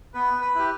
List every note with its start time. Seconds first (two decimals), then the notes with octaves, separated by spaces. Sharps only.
0.14 B3 B4
0.41 B4
0.55 E4 G4